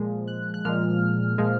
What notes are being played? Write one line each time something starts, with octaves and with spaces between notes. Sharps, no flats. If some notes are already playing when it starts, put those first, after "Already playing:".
Already playing: A#2 F3 G#3
F#6
F#6
A#2 F3 G#3 F6
A#2 F3 G#3